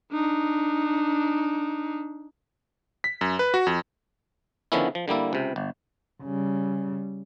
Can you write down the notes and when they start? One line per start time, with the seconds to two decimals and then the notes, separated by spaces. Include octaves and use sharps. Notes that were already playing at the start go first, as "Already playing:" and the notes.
0.12 D4 D#4
3.04 B6
3.21 F#2
3.39 B4
3.54 F#4
3.67 F2
4.72 D3 D#3 F3 B3 C#4 E4
4.95 F3
5.08 D3 G3 A#3 E4
5.33 C#2 C3
5.56 G1
6.23 C#3 G3